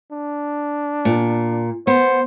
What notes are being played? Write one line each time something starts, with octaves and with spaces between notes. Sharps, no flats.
D4
A#2
B3 C5